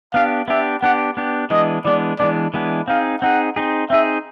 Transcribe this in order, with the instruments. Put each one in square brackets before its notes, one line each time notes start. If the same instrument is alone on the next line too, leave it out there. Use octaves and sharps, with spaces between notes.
[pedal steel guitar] B3 D4 G4 [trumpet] F5
[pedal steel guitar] B3 D4 G4 [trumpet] E5
[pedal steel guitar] B3 D4 G4 [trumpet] F#5
[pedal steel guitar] B3 D4 G4
[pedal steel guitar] E3 G#3 B3 D4 [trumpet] D#5
[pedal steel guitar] E3 G#3 B3 D4 [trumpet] D5
[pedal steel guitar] E3 G#3 B3 D4 [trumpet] D5
[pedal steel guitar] E3 G#3 B3 D4
[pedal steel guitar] C4 D#4 G#4 [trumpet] F5
[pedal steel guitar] C4 D#4 G#4 [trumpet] F#5
[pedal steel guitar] C4 D#4 G#4
[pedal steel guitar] C4 D#4 G#4 [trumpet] E5